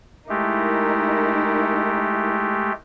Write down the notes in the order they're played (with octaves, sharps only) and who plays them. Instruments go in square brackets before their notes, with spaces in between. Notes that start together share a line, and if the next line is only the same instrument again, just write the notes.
[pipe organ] G#3 A3 G4 [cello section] D#4 E4 A#4